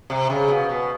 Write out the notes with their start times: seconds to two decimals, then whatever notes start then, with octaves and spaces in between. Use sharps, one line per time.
0.10 C3
0.30 C#3
0.48 B2
0.69 B2